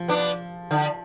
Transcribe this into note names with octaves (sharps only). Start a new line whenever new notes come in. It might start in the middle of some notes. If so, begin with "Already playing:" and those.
Already playing: F3
B3 D4
D3